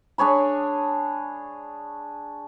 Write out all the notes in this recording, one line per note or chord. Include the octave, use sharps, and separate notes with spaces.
D4 G#4 C#5 B5